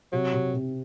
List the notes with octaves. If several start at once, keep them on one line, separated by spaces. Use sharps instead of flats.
C3 F#3
C3
C3